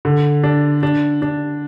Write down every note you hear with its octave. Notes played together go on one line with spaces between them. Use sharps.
D3
D4
D4
D4